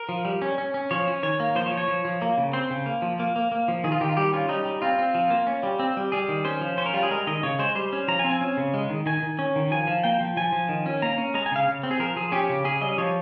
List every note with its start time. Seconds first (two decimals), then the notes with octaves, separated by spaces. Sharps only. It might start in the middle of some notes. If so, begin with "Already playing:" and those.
Already playing: A#4
0.09 F3
0.25 G3
0.42 C#4
0.58 C#4
0.74 C#4
0.91 F3 C#5
1.08 C#4
1.23 D#3 C#5
1.40 A#3
1.55 F3 C5
1.66 C#5
1.72 F3
1.77 C#5
1.88 F3
2.05 F3
2.22 A#3
2.38 C#3
2.53 C4 C5
2.70 C#3
2.86 A#3
3.02 F3
3.20 A#3
3.36 A#3
3.52 A#3
3.68 F3
3.84 D#3 G#4
3.92 F4
4.01 D#3 G4
4.09 F4
4.17 G3 G4
4.33 C#4 F4
4.49 G3 D#4
4.65 G3
4.82 C4 F4
4.99 C4
5.15 F3
5.30 A#3
5.47 C#4
5.63 G3
5.79 C4
5.97 G3
6.12 G3 G#4
6.29 D#3
6.45 C#4 C5
6.61 F3
6.78 C#4 C5
6.86 A#4
6.94 G3 F4
7.03 G#4
7.11 G#3 A#4
7.27 D#3 D#5
7.43 C#3 C#5
7.59 G#3 C5
7.75 G3 C5
7.93 C#4
8.08 F3 A#5
8.19 G#5
8.24 C4
8.30 G#5
8.41 C#4
8.57 C#3
8.74 G#3
8.90 D#3
9.06 D#3 G#5
9.23 D#3
9.39 C#4
9.56 D#3
9.71 F3 G#5
9.87 F3
10.03 A#3 G5
10.20 F3
10.37 F3 G#5
10.52 F3
10.69 D#3
10.86 C#4
11.02 A#3 A#5
11.18 C#4
11.34 G#3 A#5
11.46 G#5
11.52 C#3 F5
11.68 C#3
11.83 C4
11.91 G#4
11.99 F3 A#4
12.16 F3 G#4
12.32 C#4 G4
12.49 C#3
12.64 C#4 G#4
12.81 G3 D#5
12.98 F3 C#5